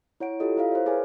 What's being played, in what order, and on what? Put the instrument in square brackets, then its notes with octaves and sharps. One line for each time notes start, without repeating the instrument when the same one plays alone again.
[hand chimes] E4 C#5 F#5 D7
E4 F4 G4 A4 D#5
E4 E5 F5
C5 C#5
G#4 A#4 B4 C#5 G#5